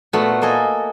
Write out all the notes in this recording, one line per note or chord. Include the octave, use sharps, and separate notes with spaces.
A#2 A3 B3 F#4 B5
A#3 A4 D#5 G#5